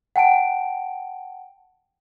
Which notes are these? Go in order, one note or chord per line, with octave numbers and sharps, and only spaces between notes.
F#5 G5 A5 D7